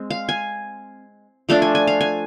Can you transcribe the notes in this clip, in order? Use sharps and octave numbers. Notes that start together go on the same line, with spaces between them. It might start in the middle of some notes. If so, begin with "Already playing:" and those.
Already playing: G#3 C4
F5
G#5
F3 A3 D4 F5
G#5
G#5
F5
G#5